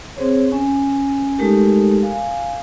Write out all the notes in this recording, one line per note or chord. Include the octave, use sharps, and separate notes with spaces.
C4 G#4 C5 C#5
C#4 G#5
G#3 A3 D#4 G4 A4 A#4
F5 G#5